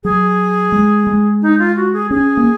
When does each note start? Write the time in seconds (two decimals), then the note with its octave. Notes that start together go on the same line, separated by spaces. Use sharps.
0.04 F#3 G#4
0.72 G#3
1.07 G#3
1.42 D#4
1.59 F4
1.76 F#4
1.93 G#4
2.11 C#4 G#4
2.37 A#3